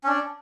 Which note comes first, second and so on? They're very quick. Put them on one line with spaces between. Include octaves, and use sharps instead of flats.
C#4 D4 D5